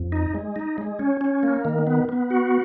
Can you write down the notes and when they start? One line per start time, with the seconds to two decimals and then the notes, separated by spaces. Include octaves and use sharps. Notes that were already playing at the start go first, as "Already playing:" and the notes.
Already playing: F2
0.12 D#4
0.35 G#3
0.56 D#4
0.78 G#3
0.99 C#4
1.21 C#4
1.43 A#3
1.65 D#3
1.87 B3
2.09 B3
2.30 F#4